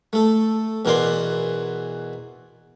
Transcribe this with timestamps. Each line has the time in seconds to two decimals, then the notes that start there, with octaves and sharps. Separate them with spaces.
0.13 A3 A4
0.85 E2 B2 E3 A#4 D5 C6